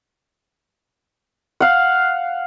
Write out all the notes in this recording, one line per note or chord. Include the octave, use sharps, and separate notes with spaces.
F5 F#5